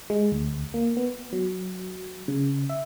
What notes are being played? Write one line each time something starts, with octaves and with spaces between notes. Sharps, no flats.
G#3
D2
A#3
B3
F#3
C#3
E5